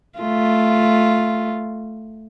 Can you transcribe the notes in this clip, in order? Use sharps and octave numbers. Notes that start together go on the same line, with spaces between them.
A3 F4